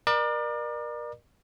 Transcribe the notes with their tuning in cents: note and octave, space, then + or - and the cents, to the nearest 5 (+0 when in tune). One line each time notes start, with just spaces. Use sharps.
A#4 +30 D5 +35